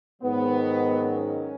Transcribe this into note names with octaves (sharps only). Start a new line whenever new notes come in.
G#2 D#3 F#3 B3
C#4